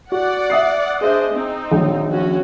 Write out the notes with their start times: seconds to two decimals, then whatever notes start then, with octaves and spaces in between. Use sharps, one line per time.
0.12 F#4 D5 F#5
0.50 E5 D#6 C7
1.01 D4 G#4 C5 D#5 E5
1.32 C4 D#4
1.72 A#1 D#3 F#3
2.08 C#4 F#4